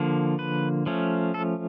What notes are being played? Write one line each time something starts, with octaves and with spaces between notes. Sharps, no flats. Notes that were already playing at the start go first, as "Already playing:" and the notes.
Already playing: D3 F3 A#3
B4
F3 A3 C#4
A4